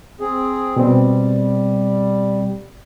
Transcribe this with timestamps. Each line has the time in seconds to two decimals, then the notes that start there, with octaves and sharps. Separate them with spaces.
0.20 C4 G#4
0.77 B2 G3 C4